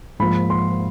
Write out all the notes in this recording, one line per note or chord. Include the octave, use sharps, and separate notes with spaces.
G#2 F3 A#3 B5
C6